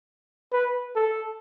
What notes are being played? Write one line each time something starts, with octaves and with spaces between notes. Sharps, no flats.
B4
A4